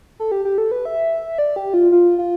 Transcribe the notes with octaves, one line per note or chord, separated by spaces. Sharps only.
A4
G4
G4
A4
B4
E5
D5
G4
F4
F4
F4